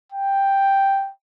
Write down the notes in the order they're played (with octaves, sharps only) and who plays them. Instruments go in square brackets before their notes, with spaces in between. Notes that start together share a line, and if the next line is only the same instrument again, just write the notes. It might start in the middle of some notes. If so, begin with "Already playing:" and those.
[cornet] G5